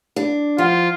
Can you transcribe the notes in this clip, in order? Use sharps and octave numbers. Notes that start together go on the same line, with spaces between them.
D4
F3 F4 F5 F#5